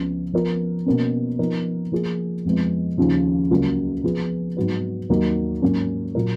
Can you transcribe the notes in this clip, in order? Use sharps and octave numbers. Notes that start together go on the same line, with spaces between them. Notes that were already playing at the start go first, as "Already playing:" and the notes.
Already playing: C#2 C#3 F3 B3
F3 B3 F4 A#4
B2 A#3 C#4
F3 B3 D#4 A#4
F3 A#3 F4 G#4
F2 F3 G#3 B3
D#2 C#3 F3
C#2 C#3 F#3 A#3 F4
F3 B3 F4 G#4 B4
G#2 F#3 B3 F#4 B4
D#2 D#3 F#3 A#3 D#4
G#2 F#3 A#3 C#4
A#2 F#3 A#3 F4 A#4